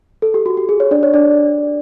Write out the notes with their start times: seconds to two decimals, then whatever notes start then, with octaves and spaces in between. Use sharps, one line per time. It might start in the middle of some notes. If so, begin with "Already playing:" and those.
0.22 A4
0.34 G4
0.46 F#4
0.57 G4
0.69 G#4
0.80 C#5
0.91 D4 D5
1.03 C#5
1.14 D4 D5